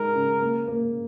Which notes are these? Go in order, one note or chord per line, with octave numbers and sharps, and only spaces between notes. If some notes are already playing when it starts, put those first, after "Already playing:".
Already playing: G#3 D#4 A#4
C#3
A#3
A#3